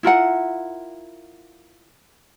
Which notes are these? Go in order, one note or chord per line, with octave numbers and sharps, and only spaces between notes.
E4 F4 A#4 F#5